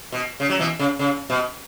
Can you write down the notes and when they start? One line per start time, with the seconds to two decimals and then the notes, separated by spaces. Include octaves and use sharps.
0.12 B2
0.40 C#3
0.49 F#3
0.59 B2 E3
0.79 C#3
0.99 C#3
1.30 B2